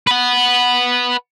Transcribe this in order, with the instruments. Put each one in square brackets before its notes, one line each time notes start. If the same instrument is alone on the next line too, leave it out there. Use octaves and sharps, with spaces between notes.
[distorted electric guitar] B4 F#5